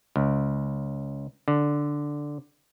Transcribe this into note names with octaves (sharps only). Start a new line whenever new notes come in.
C#2
D3